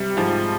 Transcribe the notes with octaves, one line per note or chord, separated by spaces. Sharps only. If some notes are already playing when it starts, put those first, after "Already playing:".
Already playing: C3 G3
G#2 F3